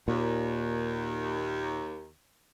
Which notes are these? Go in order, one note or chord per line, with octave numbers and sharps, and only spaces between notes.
D#2 A#2